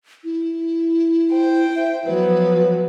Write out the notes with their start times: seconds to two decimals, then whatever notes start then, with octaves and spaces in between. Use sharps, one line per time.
0.24 E4
1.30 C5 G5
1.76 E5
2.06 F3 F#3 B3 B4